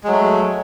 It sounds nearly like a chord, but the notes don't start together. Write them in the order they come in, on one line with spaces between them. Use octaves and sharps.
G#3 F#3 A3